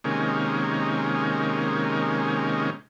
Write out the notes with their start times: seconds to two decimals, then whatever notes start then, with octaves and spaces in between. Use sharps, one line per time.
0.04 C3 D#3 G#3 A#3 C#4